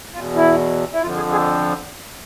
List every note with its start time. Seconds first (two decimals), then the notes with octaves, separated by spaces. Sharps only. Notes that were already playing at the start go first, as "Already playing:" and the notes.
0.13 E2 B2 F4
0.36 E4
0.93 E4
1.02 F2 D3 F3 F4
1.17 G#4
1.32 G#4